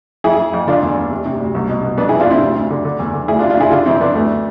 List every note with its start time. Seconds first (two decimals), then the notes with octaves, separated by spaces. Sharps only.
0.24 F2 E4 G#4
0.39 F2
0.54 F2
0.68 D3 D4 F4
0.82 E2
0.97 E2
1.11 C3
1.26 C3
1.40 D2
1.55 C2
1.69 B2
1.83 B2
1.98 F2 B3 D4
2.09 E4 G#4
2.13 C3
2.20 D4 F4
2.27 C3 C4 E4
2.41 D2
2.56 D2
2.70 D3
2.85 D3
2.99 E2
3.14 D3
3.28 D2 E4 G#4
3.39 D4 F4
3.43 C3
3.50 D4 F4
3.57 C3 E4 G#4
3.71 D3 D4 F4
3.86 F2 C4 E4
4.01 D3 B3 D4
4.15 D2 A3